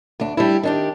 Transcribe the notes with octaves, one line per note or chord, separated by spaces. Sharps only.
D2 D4
G3 D4 E4
D#3 D4 G4